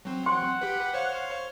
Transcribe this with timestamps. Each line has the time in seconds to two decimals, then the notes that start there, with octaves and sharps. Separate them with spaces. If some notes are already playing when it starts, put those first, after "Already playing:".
0.05 F#3 C4
0.26 F#5 C6
0.61 G4 B4
0.94 C5 C#5 F5